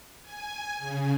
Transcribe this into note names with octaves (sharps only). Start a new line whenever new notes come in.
G#5
C#3